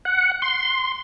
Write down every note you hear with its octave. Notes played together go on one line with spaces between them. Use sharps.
F#5
C6